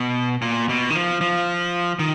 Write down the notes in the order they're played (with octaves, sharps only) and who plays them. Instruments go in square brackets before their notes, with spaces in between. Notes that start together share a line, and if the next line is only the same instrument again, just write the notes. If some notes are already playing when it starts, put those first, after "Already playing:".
Already playing: [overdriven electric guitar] B2
A#2
B2
D#3
F3
F3
D#3